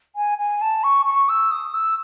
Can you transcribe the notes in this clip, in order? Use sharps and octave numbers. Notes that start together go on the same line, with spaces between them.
G#5
G#5
A5
C#6
C#6
E6
D#6
E6